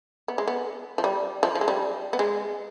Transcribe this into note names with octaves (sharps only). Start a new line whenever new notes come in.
B3
G#3
B3
F3
G3
F3
F3
G#3
G3
B3
G#3